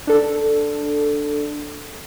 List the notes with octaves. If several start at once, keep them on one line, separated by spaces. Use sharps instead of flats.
D4 A4